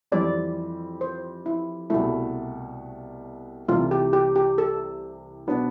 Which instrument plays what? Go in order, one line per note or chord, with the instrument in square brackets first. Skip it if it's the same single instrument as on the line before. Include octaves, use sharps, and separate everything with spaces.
[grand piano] F2 E3 G3 C4 [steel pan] D5
[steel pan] C5
E4
[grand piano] C2 B2 A3 [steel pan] E4
[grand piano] C2 C3 E3 A3 [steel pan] F4
[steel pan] G4
G4
G4
A4
[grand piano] B2 B3 D4